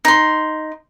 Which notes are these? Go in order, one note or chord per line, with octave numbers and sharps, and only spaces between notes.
D#4 C6